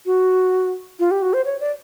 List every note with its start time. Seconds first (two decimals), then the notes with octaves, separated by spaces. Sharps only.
0.06 F#4
0.99 F4
1.11 G4
1.22 F#4
1.33 C5
1.45 C#5
1.60 D5